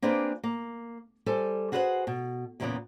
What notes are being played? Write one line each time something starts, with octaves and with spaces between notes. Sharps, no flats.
A#3 C4 D4 F4 G#4 B4
A#3
G3 A4 C5 G#5
F#4 G#4 B4 C5 F5 F#5
B2
E2 A#2 C#3 G#3 A#3 B3